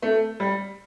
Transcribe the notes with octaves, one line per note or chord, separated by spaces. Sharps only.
A3
G3